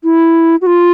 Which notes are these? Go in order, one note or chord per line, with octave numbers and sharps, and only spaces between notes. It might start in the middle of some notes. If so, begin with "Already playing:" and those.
E4
F#4
F4